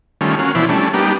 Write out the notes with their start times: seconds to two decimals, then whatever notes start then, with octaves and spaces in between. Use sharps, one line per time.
0.21 D#3 G3 A3 C#4 F4
0.39 A#3 C#4 F#4 F5
0.55 B2 E3 F3 E4 C5 D5
0.69 G3 A3 C#4 D4
0.94 G3 A#3 B3 D4 D#4 G4